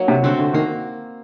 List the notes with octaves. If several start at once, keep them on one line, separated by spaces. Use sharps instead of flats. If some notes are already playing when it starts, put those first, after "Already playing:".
Already playing: F#3 A#3 D#4
C3
D3 A3 C4 F#4
D3
D#3 A#3